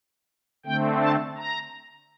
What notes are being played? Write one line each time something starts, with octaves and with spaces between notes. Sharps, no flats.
D3 A3 C4 G5
A5
A#5